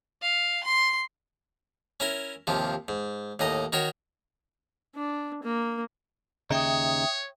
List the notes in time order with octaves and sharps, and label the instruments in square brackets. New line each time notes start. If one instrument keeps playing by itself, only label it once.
[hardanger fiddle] F5
C6
[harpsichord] C#4 E4 A#4
D#2 C3 F3
G#2
D#2 A2 D#5 A#5
D#3 F#4 A#4 C#5
[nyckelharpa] D4
A#3
[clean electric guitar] D#2 C#3 D#4 [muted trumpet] C#5 [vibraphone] E5 G5 D#6